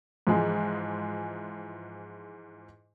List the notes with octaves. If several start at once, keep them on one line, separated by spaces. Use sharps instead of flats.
G#2 E3 F3 G#3